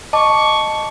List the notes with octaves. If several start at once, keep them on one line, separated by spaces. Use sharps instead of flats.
D#5 A5 C#6 D6